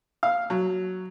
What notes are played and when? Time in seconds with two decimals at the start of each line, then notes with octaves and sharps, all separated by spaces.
0.23 F5
0.50 F#3